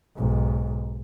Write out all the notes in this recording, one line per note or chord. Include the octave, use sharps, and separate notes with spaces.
B1 G#2